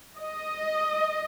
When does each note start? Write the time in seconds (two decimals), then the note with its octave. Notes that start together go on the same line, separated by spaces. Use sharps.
0.19 D#5